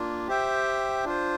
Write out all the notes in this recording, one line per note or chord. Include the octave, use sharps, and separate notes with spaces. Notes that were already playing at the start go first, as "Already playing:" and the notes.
Already playing: A#3 D4 F4
G4 C5 E5 G5
D4 F4 C5